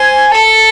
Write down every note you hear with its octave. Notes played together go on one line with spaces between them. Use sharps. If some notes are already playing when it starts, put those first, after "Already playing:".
Already playing: C5 G#5
A4 A5